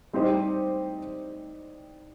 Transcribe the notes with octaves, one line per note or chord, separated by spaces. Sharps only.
G3 C4 D#4 G4 C5